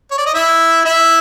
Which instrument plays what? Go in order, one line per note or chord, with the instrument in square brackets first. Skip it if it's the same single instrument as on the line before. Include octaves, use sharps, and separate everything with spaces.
[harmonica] C#5
D5
D#5
E4 E5
E4 E5